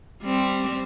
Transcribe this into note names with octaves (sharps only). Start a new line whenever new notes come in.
G3 C4